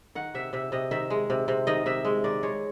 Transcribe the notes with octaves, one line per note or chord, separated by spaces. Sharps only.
D#3 F#5
C3 E5
C3 E5
C3 D#5
D#3 E5
G#3
C3
C3
D#3 D#5
C3 E5
G#3
D#3 D5
G#3 C#5